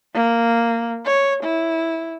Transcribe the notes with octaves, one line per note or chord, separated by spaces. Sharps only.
A#3
C#5
E4